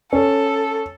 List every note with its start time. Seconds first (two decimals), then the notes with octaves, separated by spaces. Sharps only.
0.13 C#4 A4